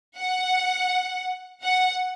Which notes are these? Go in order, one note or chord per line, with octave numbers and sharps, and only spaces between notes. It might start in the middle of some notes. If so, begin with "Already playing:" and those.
F#5
F#5